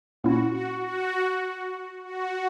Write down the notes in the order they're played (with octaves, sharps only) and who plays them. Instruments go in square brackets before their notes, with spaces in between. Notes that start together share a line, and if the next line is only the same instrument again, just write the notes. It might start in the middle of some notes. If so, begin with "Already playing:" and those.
[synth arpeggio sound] A#2 A#3 C#4 E4 [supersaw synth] F#4
[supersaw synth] F#4
F#4
F#4